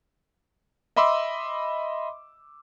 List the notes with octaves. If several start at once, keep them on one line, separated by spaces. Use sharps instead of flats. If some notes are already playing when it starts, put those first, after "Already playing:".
D#5 E5 B5 C6 D6 E6